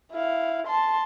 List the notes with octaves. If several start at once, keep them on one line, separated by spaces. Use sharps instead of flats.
E4 F5
A5 C6